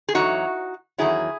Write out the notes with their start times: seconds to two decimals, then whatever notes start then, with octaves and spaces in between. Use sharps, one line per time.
0.09 G#4
0.15 E2 D#3 F#3 D#4 F#4
0.98 E2 D#3 F#3 E4 G#4